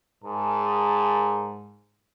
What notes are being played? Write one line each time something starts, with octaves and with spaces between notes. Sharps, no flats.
G#2 G#4 A#4 A5